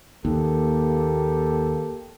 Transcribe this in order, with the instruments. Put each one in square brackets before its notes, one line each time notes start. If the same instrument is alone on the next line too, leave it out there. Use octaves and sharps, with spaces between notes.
[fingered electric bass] D#2 [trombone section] A#3 G4 A4